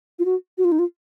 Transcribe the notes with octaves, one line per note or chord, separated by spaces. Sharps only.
F4
F#4
F#4
F4
D#4
F4